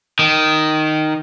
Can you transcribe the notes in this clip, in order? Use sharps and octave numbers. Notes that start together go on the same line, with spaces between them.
D#3